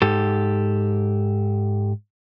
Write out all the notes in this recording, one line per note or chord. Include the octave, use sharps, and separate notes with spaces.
G#2 G4 A4